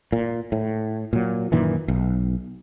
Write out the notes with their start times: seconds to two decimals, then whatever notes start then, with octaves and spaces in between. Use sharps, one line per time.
0.12 A#2
0.52 A2
1.13 A#2 F#3
1.52 F#2 A#2 D#3 E3
1.88 B1